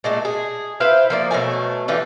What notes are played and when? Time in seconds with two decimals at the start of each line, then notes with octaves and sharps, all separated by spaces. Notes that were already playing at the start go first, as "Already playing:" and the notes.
0.04 A#2 G#3 A3
0.25 G#4
0.80 E4 B4 C5 F5
1.10 F3 A#3 D5
1.31 B2 F#3 A3 G#5
1.88 D3 E3 F4 G4